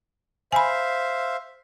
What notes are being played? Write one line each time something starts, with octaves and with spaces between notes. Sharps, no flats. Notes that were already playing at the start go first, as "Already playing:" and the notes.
C5 E5 F5 G#5 B5